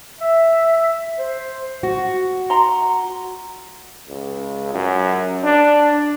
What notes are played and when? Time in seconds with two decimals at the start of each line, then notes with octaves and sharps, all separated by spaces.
0.20 E5
1.19 C5
1.83 F#4
2.50 A#5 C6
4.09 C#2
4.74 F#2
5.44 D4